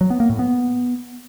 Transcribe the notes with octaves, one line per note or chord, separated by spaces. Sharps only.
F#3
B3
A#3
A2
B3